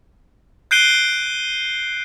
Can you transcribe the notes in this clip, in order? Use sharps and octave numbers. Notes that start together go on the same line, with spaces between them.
F#6 G6 C7 D7 D#7 G7